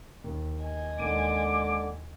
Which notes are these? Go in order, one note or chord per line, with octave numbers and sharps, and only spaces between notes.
D#2
D#5 G#5
D#2 D3 G#3 D6 D#7